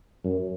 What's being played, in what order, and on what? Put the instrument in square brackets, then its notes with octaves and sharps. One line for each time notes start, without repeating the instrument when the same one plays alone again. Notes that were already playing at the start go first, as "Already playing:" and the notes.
[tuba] F#2